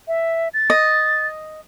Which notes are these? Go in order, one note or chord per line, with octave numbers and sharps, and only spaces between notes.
E5
A6
D#5